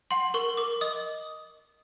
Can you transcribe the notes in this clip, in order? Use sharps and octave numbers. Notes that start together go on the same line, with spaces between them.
F#5 C6
A#4 C#6
A#4 D6
D#5 D#6